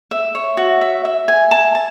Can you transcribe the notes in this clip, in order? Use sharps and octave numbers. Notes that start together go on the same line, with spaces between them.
E5
C#5
F#4
E5
E5
G#5
A5
A5